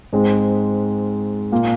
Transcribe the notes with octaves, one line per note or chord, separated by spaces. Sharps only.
G#2 G#3 C4
A#2 A#3 F4